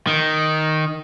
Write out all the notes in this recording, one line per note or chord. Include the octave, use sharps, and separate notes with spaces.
D#3